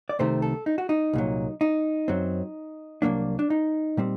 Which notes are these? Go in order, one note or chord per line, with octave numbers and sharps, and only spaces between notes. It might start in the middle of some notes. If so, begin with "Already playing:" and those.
D5
C2 C3 D#3 A3 C4 C5
A4
D#4
F#4
D#4
C2 A#2 F#3
D#4
F#2 F#3 C4
C2 A#2 F#3 A#3 D4
D4
D#4
A#2 G3 C4